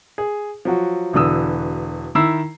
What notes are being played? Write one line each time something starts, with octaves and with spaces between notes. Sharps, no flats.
G#4
F3 F#3 F#4
E1 B2 D3 E3 D#6 E6
D#3 E4 E6 C7